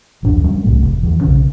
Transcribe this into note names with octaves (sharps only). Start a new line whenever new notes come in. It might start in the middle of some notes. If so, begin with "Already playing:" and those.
D#1 A1 F#2 D4
F#3 G3 C4 C#4
C2 A2 A3
F1
F2 D#3 E3
B1 C#3 C#4